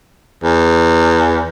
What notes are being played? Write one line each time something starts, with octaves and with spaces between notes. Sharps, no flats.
E2